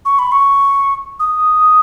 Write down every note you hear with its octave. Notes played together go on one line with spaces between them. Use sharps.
C#6
B5
C#6
D#6